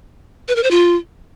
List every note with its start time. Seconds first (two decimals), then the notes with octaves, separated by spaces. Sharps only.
0.48 B4
0.56 A#4
0.63 C5
0.71 F4